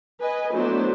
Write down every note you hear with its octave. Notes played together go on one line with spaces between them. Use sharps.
B4 D#5 G#5
F#3 A3 B3 D4 E4 C5